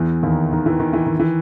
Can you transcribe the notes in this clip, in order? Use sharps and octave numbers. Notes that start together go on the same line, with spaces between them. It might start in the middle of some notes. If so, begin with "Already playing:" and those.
Already playing: E2 E3
D#2 D#3
D#3
E3
D#3
E3
D#3
E3